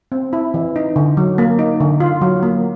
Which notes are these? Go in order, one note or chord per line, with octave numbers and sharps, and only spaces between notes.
C4
E4
E3
D#4
D3
F#3
A#3
D#4
D3
F4
F#3
A#3